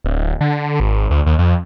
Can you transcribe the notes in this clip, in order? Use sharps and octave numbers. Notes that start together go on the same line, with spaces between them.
D1
D3
G#1
D2
D#2
F2